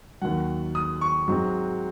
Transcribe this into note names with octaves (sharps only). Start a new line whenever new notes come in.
D#2 D#3 F#3 F#5
D#6
C#6
G#2 F#3 C4